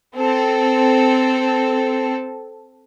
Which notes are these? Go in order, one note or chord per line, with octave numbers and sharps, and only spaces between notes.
C4 A4